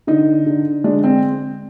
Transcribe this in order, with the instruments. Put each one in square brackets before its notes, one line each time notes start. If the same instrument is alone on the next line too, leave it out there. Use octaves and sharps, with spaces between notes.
[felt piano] D3 D#4
D3
G#3 D4
C4